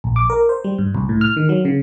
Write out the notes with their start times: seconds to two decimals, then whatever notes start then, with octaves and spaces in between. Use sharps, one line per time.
0.04 A#1
0.16 D6
0.30 A#4
0.49 C5
0.64 G3
0.78 G2
0.95 C2
1.09 A2
1.21 F6
1.37 D#3
1.49 F#3
1.65 C#3